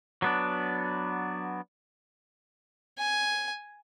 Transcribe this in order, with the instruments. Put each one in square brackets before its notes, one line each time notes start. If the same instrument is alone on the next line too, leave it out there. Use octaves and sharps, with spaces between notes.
[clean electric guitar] F#3 B3 D4
[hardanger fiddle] G#5